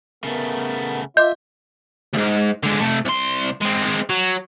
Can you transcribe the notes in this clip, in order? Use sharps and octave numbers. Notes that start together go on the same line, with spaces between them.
C#3 A3 B3 A#4
F4 D#5 E5 C6 D6 G6
D2 G#2
D3 G#3
C3 A3
C2 C6
G#3 C4
F#3